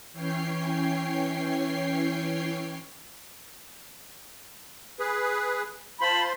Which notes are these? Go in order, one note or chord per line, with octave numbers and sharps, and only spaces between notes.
E3 C#4 C#5 G5 C7
G#4 B4
F4 C5 A5 B5 C6